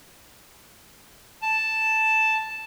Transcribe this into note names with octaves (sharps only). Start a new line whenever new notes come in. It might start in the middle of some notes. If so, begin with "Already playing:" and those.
A5